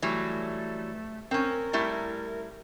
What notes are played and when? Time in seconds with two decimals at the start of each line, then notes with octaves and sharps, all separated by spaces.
0.02 E3 F#3 G3 A3
1.31 C4 C#4 A#4
1.73 G3 A3 E4